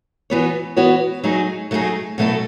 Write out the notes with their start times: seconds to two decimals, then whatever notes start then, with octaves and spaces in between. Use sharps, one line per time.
0.30 E3 B3 F#4 C#5
0.76 E3 B3 F#4 C#5
1.24 F#3 A3 D#4 G#4
1.71 F#3 A3 D#4 G#4
2.18 B2 F#3 A3 E4 A4